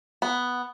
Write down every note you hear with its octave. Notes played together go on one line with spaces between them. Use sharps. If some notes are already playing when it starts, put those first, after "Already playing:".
B3